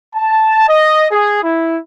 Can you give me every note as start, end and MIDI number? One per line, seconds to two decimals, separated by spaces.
0.14 0.66 81
0.68 1.06 75
1.11 1.42 68
1.44 1.77 64